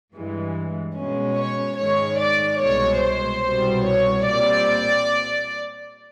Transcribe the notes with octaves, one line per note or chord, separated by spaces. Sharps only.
G2 E3 G#3
B2 G#3 C#4
C#5
G#2 D#3 G#3 C#5
D5
C2 B2 G#3 C#5
C5
C2 B2 G3
C#5
A#2 G3 C4 D5